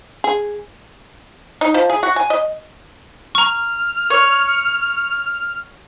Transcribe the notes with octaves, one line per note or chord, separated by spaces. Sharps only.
G#4
D#4
F3
G#4
F#4
G#5
D#5
A#5 C#6 F6
C#5